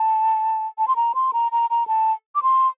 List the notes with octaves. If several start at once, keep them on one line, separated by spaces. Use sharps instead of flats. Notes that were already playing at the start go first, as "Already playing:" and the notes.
Already playing: A5
A5
C6
A#5
C6
A#5
A#5
A#5
A5
D6
C6